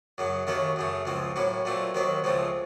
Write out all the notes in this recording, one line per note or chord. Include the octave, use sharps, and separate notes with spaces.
F#2 C#3 F#3
D#2 D#3 A3 C#4 F#4
F#2 C#3 A3
C#2 C#3 F3 C4
A2 F#3 A#3 C#4
A#2 F#3 A3 C4
D#2 D#3 F#3 C4 F#4
C#2 C#3 F3 A3 C4